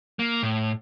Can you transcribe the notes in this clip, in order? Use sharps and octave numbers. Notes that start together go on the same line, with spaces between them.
A#3
A2